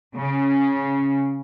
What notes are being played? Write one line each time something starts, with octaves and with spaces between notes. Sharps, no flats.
C#3